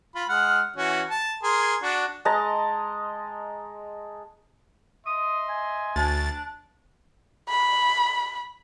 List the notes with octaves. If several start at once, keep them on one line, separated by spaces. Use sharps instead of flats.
F4 B5
G#3 F#5 F6
E3 C#4 F#4
A5
G#4 A#4 C6
D4 F#4
G#3 D#5 A5 A#5
D#5 E5 C6 D#6
G#5
D2 D4 A6
B5